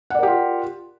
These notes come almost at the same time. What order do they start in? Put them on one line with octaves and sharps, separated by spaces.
F#5 D5 A#4 G4 F4